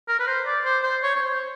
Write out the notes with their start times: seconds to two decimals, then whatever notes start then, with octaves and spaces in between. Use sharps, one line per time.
0.08 A#4
0.19 B4
0.27 C5
0.46 D5
0.65 C5
0.83 C5
1.03 C#5
1.16 C#5
1.22 C5